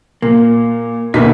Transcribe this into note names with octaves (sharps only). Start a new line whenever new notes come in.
A#2 A#3
D2 B2 A#3 D#4 F#4 B6